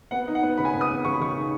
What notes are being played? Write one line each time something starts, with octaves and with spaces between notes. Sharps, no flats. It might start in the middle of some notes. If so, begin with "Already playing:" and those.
B3 F#5
D#4
F#5
B3
C#3 B5
G#5
B3 B5
D#6
B3
C#3 C#6
B5
C#3 C#6
D#4